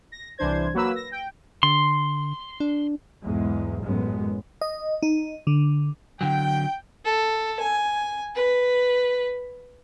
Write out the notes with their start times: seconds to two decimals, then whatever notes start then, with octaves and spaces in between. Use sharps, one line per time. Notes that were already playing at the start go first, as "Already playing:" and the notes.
0.12 A#6
0.38 C2 E3 D4 C5 G#6
0.74 F#3 A#3 B4 E6
0.95 A#6
1.11 G5
1.63 D3 C6
2.60 D4
3.23 B1 E2 G#2 G#3
3.82 A1 F#2 G#3 B3
4.61 D#5
5.02 D#4
5.47 D3
6.21 D3 F#3 G5
7.05 A4
7.60 G#5
8.35 B4